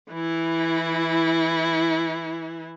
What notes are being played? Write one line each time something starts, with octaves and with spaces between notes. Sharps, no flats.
E3 E4